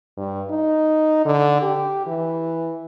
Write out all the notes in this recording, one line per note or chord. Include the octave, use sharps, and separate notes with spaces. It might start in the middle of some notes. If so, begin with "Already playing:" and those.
G2
D#4
D3
G4
E3